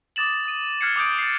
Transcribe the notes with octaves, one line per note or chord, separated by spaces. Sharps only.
D6 D#6 A6 E7 F#7
D#6 D#7
F6 F#6 G#6 C7 C#7
D6 D#6 G6 D7
A6 C7